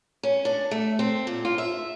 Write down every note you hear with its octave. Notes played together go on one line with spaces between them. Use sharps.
C#4
D4
A3
C4
A#2
F4
E5